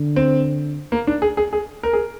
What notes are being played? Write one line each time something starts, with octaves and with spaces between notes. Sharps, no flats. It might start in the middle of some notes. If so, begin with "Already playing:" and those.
Already playing: D3
C4
A#3
D4
G#4
G#4
G#4
A#4
G#4